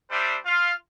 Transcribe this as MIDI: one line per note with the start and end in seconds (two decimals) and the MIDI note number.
0.11 0.37 55
0.11 0.37 62
0.11 0.37 72
0.11 0.37 74
0.11 0.37 76
0.45 0.73 65
0.45 0.73 77